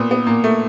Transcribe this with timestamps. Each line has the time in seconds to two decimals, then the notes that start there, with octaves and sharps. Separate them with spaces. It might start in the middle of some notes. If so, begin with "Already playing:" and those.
Already playing: A#2 B3
0.11 B3
0.26 A#2 A#3
0.44 A3